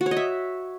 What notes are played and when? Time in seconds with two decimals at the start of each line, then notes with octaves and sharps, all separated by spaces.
0.01 F#4
0.06 C#5
0.11 D#5
0.17 E5